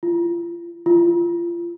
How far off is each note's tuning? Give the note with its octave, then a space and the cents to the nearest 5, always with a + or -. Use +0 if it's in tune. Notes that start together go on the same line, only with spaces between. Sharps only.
F4 -35
F4 -30